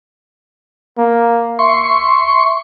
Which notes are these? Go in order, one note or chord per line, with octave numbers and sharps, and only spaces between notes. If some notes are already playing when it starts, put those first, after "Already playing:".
A#3
E5 C6 C#6